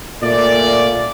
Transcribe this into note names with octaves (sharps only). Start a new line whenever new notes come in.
A#2 A3 D5